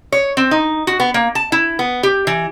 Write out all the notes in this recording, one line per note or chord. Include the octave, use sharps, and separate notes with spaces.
C#5
C4
D#4
F#4
B3
A#3
A5
E4
B3
G4
E3